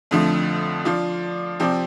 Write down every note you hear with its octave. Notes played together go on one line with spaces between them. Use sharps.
F2 D3 F3 A3
F3 D4 F4 D5
C3 F3 C4 G4 D5